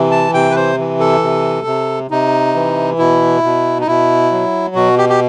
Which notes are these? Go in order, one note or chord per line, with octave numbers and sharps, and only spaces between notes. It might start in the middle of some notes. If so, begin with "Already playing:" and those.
Already playing: C3 E3
A5
C3 G5
B4
C5
E3
A4
C3
C3
C3 D#4
E3
B2 E4
B2
D#4
B2 E4
F#3
B2 F#4
G4
G4